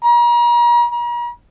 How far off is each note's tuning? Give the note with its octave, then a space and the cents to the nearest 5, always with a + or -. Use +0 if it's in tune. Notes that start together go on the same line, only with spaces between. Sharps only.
A#5 +40
A#5 +45